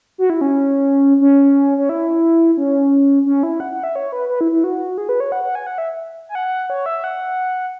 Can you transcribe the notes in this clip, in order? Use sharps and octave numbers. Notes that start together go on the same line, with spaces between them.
F#4
E4
C#4
C#4
C#4
E4
C#4
C#4
E4
F#5
F#5
E5
C#5
B4
B4
E4
E4
F#4
G#4
B4
C#5
F#5
F#5
G#5
F#5
E5
G#5
F#5
C#5
E5
F#5